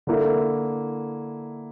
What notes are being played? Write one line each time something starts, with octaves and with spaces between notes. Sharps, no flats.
D3 A#3 E4